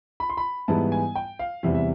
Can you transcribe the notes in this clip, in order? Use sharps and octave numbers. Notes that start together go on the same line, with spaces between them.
B5
C6
B5
G#2 E3 G3 B3 E4 A5
G#5
G5
F5
E2 C3 E3 G3 E5
E5